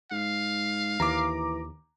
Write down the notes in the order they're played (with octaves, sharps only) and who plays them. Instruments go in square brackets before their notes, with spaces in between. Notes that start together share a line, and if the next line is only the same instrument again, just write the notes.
[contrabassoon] G#2 [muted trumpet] F5
[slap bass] D#2 [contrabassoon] E3 [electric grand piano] A#5 D6